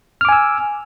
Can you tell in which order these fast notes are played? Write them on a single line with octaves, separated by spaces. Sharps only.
F6 D6 G#5 E6